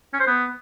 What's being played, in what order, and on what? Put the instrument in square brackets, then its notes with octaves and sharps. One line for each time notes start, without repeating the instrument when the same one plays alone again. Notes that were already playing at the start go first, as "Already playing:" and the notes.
[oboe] C#4
C5
B3